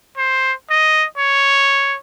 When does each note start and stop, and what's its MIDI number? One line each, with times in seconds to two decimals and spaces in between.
0.18 0.53 72
0.70 1.06 75
1.18 1.98 73